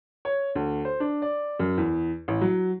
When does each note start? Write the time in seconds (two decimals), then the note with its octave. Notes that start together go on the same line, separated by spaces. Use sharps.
0.25 C#5
0.55 D2
0.85 C5
1.00 D4
1.22 D5
1.59 F#2
1.78 E2
2.28 A1
2.41 F#3